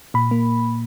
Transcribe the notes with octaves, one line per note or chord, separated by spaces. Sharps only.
A#2 B5
A#3